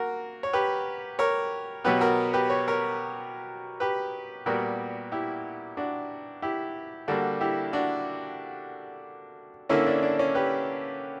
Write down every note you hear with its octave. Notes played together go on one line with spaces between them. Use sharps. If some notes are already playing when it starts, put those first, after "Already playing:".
Already playing: A#3 F#4 A#4
C#5
G4 B4
A#4 C#5
B2 F#3 B3 G4 B4
F#4 A#4
G4 B4
C#5
A#4 C#5
G4 B4
A#2 G3 B3 F#4 A#4
E4 G4
D4 F#4
E4 G4
D3 G3 A#3 D4 F#4
E4 G4
D4 F#4
D3 A#3 C#4 E4
D4
D4
C#4
G4 B4